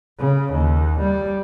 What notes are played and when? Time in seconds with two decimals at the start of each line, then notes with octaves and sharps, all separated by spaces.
0.19 C#3
0.53 D#2
1.00 G3